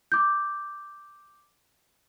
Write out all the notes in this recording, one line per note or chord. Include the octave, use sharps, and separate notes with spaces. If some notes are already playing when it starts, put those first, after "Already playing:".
D6 G6